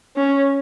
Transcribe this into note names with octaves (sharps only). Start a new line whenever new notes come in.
C#4